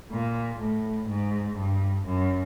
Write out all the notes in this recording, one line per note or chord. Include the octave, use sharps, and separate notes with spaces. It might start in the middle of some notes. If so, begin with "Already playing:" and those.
A#2
A2
G#2
G2
F#2